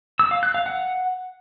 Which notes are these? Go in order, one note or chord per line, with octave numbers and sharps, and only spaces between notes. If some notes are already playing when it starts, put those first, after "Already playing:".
E6
F5
F#6
F5
F#5